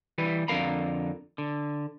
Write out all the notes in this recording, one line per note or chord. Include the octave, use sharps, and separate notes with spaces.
E3 G3 B4
F2 D3 A#4 F5 A#5 B5
D3